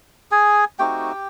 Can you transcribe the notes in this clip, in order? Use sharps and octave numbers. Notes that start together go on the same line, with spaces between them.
G#4 G#5
A3 C4 D#4 F#4 G4 G5